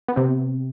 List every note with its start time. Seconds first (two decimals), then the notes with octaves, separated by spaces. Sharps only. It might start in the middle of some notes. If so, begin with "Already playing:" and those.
0.08 B3
0.16 C3 C4